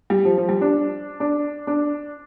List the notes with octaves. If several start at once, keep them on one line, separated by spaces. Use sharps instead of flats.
G3
F3
F3
G3
D4
D4
D4